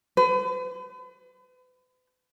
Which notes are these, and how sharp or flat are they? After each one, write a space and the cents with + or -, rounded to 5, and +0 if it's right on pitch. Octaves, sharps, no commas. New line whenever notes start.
B4 +40